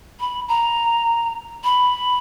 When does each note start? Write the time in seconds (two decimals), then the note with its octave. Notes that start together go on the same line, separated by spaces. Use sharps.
0.20 B5
0.48 A#5
1.64 B5